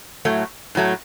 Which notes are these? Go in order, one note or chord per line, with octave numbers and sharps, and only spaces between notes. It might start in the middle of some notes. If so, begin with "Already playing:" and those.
A2 F#3 A3
A2 F#3 A3